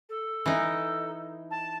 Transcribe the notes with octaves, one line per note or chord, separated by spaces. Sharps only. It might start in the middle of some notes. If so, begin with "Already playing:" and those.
A4
E3 D#4
A5